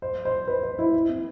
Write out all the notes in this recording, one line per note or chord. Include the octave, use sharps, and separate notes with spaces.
C5
C5
B4
C5
E4
C4